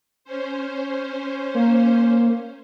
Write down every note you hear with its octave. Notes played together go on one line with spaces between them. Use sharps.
C#4 C5
A#3